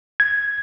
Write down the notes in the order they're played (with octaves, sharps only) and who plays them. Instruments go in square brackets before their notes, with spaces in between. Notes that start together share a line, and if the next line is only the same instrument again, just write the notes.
[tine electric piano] G#6